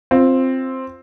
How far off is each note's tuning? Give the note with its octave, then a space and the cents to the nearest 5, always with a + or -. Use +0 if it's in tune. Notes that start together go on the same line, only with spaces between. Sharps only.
C4 +5 F4 +0